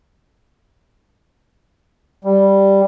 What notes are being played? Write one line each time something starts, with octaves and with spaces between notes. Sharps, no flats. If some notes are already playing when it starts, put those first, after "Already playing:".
G3